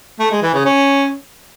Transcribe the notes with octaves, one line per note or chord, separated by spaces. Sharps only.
A3
G#3
E3
C#3
C#4